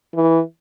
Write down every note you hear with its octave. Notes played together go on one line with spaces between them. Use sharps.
E3